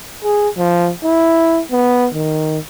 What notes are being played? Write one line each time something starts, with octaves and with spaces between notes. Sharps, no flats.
G#4
F3
E4
B3
D#3